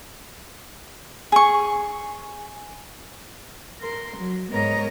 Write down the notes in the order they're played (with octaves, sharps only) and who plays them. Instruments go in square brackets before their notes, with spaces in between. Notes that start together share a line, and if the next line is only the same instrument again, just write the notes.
[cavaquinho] G#4 C#6
[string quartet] A#4 C6
F#3
G#2 B3 A#4 C#5 D#5 A#5